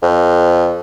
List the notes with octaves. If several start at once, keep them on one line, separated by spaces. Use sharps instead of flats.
F2